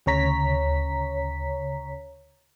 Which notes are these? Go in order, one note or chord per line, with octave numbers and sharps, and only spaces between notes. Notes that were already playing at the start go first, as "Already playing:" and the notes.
D2 C#3 C#5 A#5 B6